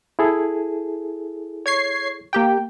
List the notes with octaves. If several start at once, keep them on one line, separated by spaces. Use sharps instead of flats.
E4 G#4 A4
C#5 G#6 C7
A#3 G4 G5